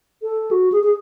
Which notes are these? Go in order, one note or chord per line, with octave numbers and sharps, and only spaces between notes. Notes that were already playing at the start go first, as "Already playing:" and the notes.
A4
F#4
G#4
G#4